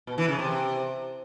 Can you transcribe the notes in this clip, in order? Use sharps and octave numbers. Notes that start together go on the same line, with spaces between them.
B2
E3
C#3
C3